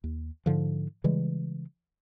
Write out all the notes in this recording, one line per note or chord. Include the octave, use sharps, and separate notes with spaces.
D#2
G#2 D3 F3
C#3 E3 G3 G#3